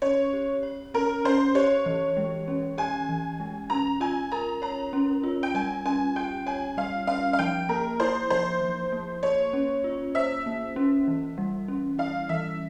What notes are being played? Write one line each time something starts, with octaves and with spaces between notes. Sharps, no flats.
C#4 C#5
G4
C#5
C#4 A#4
C#4 C5
G4 C#5
E3
G#3
C#4
G4 G#5
E3
G#3
C#4 A#5
F4 G#5
A#4 A#5
C#5 A#5
C#4
F4
G5
G3 G#5
C#4 G#5
G4 G5
C#5 G#5
G3 F5
C#4 F5
F5
F3 G5
A#3 A#4
E4 C5
F3 C5
F3
A#3
A#3 C#5
C#4
F4
C5 E5
A#3
C#4
E3
G3
C#4
E4 F5
E3 E5